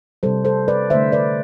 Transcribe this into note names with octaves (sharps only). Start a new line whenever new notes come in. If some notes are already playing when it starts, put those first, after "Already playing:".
C3 G3 A4 C5
A4 C5
B4 D5
D3 A3 C5 E5
B4 D5